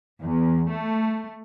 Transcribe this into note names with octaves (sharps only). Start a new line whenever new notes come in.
E2
A3